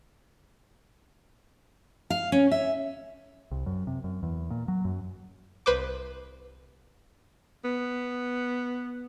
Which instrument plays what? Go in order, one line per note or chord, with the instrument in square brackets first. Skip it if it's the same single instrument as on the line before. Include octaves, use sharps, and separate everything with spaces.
[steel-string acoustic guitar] F5
C#4
E5
[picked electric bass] C2
F#2
C3
F#2
E2
A#2
F#3
F#2
[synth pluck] C2 B4 C5 D6
[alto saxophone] B3